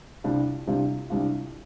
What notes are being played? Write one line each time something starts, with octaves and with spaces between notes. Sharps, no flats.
C2 C3 G3 D4 F4
C2 C3 G3 D4 F4
C2 C3 G3 D4 F4